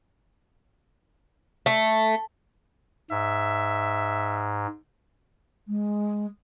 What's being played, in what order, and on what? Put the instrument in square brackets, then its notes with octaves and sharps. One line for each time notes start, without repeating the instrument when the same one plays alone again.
[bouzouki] A3
[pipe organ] G#2 [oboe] E5
[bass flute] G#3